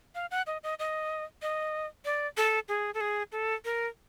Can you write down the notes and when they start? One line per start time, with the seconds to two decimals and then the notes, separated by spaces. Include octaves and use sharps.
0.15 F5
0.31 F#5
0.47 D#5
0.63 D#5
0.79 D#5
1.42 D#5
2.05 D5
2.37 A4
2.68 G#4
2.94 A4
3.01 G#4
3.32 A4
3.65 A#4